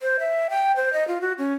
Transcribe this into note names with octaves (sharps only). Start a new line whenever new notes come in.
C5
E5
G5
C5
D#5
F4
F#4
C#4